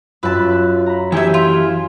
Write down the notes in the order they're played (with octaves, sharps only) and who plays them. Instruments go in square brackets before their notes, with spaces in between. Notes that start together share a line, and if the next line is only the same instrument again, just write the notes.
[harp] F#2 E6 [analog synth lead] F4 [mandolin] B4 A5
[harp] A#5 B5
[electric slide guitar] E3 E4 G4 [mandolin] C#5 E5 [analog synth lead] G#5
[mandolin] F4